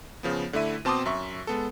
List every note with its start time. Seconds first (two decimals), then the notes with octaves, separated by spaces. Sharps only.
0.23 C#3 F3 B3
0.53 D3 A3 E4 E5 D#7
0.85 B2 C4 A5 C6 D6 D#6
1.06 F#2 E5 C#6
1.47 G#3 B3 A4